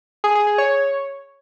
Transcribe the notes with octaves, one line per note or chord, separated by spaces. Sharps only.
G#4
G#4
G#4
C#5